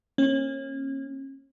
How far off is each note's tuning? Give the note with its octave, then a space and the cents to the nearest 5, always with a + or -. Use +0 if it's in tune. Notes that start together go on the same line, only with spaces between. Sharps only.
A#3 +0 C#4 -35